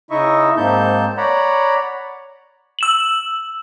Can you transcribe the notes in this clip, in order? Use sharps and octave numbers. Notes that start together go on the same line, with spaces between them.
C#3 D#4 E4 D#5 E5 C#6
G#2 A#3 C4 D#4 A5 G6
C#5 D5 F#5 A#5 B5
E6 E7 F#7